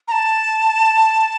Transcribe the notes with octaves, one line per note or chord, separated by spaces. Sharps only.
A#5
A5